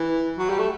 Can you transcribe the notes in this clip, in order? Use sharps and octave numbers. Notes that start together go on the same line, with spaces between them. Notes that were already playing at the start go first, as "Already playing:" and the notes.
Already playing: E3
F#3
G3
A3